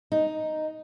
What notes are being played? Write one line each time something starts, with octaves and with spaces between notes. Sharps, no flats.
D#4